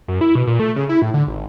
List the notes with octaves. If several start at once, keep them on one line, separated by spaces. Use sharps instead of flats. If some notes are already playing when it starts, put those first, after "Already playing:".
F#2
E4
B2
A#2
A3
C#3
E4
A2
D3
G#1